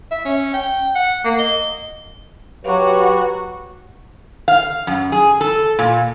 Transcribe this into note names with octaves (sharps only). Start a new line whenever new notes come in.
E5
C#4
G5
F#5
A#3
D#5
F#3 F#4 G4 B4 C#5
F5
F#2
G#4
A4
A#2